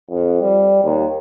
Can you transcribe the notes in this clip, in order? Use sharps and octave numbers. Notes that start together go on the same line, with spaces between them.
F2
G3
D#2